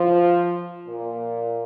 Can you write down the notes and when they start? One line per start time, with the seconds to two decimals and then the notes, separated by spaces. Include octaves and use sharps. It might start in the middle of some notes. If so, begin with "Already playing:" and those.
Already playing: F3
0.88 A#2